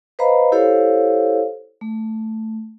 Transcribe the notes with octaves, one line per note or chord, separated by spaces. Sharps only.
B4 C5 D#5 F5 A#5 B5
E4 G4 A4 C5 C#5 F5
A3